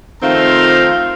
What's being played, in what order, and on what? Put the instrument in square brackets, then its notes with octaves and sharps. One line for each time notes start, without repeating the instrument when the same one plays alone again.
[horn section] D#3 F3 A3 C4 F5 A#5